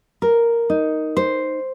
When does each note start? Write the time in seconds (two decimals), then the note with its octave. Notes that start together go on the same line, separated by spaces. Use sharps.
0.22 A#4
0.70 D#4
1.17 C5